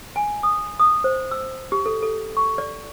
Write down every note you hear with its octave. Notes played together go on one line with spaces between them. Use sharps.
G#5
D#6
D#6
C5
E6
G4
A4
A4
C#6
D5